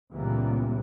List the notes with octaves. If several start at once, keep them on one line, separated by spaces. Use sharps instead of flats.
C#2 A#2 E3 G3 A#3 B3